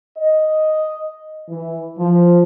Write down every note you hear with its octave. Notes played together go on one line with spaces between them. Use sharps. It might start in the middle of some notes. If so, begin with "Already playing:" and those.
D#5
E3
F3